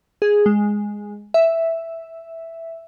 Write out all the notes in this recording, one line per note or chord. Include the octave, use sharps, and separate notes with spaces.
G#4
G#3
E5